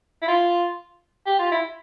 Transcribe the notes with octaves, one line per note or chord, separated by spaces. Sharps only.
E4
F4
G4
F4
E4